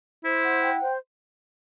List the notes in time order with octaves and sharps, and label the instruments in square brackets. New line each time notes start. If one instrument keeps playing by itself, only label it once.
[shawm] E4 [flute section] C5
[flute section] F#5
G5
C5